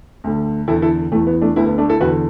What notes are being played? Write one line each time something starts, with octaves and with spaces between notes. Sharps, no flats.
D2 D3
E2 D3 E4 A4
E4 A4
E2 E3 A3
B3
A3 D4
D2 D3 B3 E4
B3
A3 D4
E4 A4
E2 D3 F#4 B4